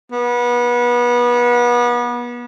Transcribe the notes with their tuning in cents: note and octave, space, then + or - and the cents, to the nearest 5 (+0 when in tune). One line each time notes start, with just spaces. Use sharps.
B3 -30